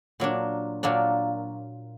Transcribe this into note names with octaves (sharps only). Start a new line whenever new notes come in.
A#2 F#3 A#3 D4
A#2 F#3 A#3 D4